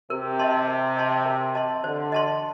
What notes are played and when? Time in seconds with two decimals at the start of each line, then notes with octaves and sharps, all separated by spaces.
0.10 C3 A#4
0.39 D#5 A5 C6
0.68 A#4
0.97 D#5 A5 C6
1.25 A#4
1.55 D#5 A5 C6
1.84 D3 C5
2.12 D#5 A5 C6